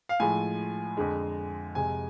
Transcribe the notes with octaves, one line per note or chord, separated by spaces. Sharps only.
F5
A2 F3 G#3 G#5
F2 D3 G#3
F2 C3 G#3 G#5